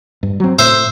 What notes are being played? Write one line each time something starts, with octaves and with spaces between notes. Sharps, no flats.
G2
F#3 C4
A2 C5 E5